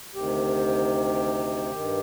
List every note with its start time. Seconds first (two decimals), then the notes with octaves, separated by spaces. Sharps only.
0.14 D2 C3 D#3 G4
1.71 G2 D#3